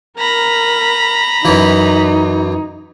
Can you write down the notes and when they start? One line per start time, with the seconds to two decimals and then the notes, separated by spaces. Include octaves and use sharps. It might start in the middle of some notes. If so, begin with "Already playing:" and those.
0.19 A#4 A#5 B5
1.45 F#2 E3 D#4